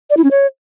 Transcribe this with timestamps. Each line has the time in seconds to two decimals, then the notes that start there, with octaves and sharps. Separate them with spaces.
0.10 D5
0.17 E4
0.24 C#4
0.31 C#5